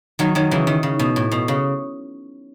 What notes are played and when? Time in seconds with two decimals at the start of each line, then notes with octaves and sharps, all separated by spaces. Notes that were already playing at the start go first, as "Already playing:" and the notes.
0.19 D#3 F#3
0.35 D#3 F#3
0.51 C#3 E3
0.67 D#3
0.83 C#3
0.99 B2
1.16 A2
1.31 B2
1.48 C#3